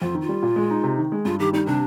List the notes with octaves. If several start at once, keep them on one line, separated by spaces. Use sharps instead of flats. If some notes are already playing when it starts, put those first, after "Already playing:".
F2 F4
D#3
F4
G3
A#2
G#3
D#4
C3
D#3
G#3
G2 F4
D#3 G4
G3 D#4
C3 D4